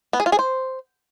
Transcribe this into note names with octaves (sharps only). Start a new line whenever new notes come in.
B3
G#4
F4
G#4
C5